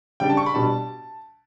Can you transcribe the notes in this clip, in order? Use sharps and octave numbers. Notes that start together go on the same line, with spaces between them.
C#3 G3 D4 G5
A5
C#6
B5
B2 G3 D4 A5